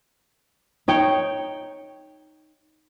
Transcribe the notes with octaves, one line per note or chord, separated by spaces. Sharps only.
D#4 C#5 G5